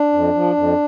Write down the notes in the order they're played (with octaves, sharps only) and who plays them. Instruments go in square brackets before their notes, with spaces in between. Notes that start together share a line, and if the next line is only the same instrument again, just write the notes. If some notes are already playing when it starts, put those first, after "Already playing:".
Already playing: [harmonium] D4
F2
F3
F2